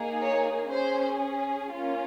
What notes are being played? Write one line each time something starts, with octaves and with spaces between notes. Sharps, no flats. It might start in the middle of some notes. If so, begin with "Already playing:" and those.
Already playing: A#3 D#4 G#4
C#5
C#4 G#4 C5
A#3 C#4 F4